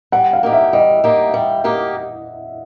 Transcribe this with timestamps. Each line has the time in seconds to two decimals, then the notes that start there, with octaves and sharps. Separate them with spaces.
0.12 G3 F#5
0.33 F5
0.43 A#3 D#4 G4
0.53 E5
0.73 G3 D#5
1.04 A#3 D#4 G4
1.34 G3
1.64 A#3 D#4 G4